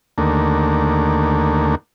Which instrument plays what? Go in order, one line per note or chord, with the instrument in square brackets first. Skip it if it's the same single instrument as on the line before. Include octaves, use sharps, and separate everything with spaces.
[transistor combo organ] D#2 D3 A3 A#3